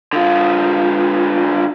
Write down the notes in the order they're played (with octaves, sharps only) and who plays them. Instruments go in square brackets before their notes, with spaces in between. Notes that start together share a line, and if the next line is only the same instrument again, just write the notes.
[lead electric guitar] D3 F4